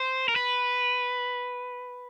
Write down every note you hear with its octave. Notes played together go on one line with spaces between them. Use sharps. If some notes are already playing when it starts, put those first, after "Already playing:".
Already playing: C5
A#4
B4